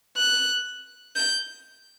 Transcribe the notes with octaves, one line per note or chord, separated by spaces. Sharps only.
F#6
G6